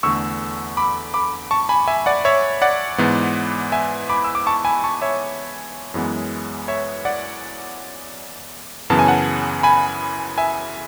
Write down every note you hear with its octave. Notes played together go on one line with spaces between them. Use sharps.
E2 D3 A3 C#6 E6
B5 D6
B5 D6
A5 C#6
G#5 B5
E5 G#5
D5 F#5
C#5 E5
D5 F#5
G#2 E3 B3
E5 G#5
B5 D6
E6
D6
A5 C#6
G#5 B5
A5 C#6
C#5 E5
F#2 E3 G#3 B3
C#5 E5
D5 F#5
F#2 C#3 E3 B3 A5
G#5
F#5 A5
G#5 B5
E5 G#5